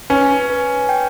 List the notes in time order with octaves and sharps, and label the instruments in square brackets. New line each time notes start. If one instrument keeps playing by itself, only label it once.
[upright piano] C#4 [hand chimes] B4
[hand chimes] B4
G5